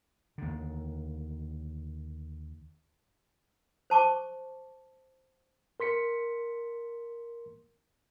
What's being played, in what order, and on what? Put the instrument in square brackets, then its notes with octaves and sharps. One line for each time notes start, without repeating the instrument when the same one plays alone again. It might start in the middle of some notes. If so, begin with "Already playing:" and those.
[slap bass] D#2 D3
[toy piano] C5 A5 C#6 D6
[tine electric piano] A#4 C6 B6 C#7